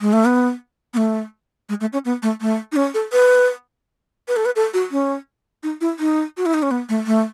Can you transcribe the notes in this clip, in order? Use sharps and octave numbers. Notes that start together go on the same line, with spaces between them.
G#3
A3
B3
B3
A3
G#3
A3
C#4
B3
A3
A3
D#4
C#4
A4
B4
B4
A4
B4
A4
F#4
C#4
D#4
E4
D#4
F#4
E4
D#4
C#4
B3
A3
A3